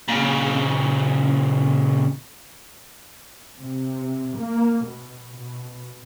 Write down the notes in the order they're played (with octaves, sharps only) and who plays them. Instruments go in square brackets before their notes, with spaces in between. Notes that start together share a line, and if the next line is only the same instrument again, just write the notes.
[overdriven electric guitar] A#2 C#3
[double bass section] C3
A#3
B2
B2